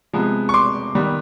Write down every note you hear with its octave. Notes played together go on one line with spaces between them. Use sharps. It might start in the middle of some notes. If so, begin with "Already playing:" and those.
C3 F3 G#3 B3
C#6
C6 D6
D#3 G3 B3